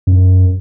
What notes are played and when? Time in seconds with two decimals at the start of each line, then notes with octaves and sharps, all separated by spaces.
0.07 F#2